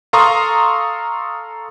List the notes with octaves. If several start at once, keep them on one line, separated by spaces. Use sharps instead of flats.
A4 F5 A#5 C6 C#6 D#6